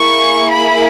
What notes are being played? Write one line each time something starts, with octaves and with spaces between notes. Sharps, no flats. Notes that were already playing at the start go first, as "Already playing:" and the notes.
Already playing: A#3 E4 G#4 C#6
B5